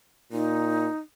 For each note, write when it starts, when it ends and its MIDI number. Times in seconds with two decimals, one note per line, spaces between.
0.32 0.88 46
0.32 0.98 63